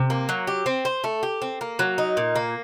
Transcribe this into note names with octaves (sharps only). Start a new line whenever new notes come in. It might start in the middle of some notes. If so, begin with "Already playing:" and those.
Already playing: C3
A#3
F#3
G4
C4
C5
A3
G4
C4
A#3
F#3
D#4
A#2
A#3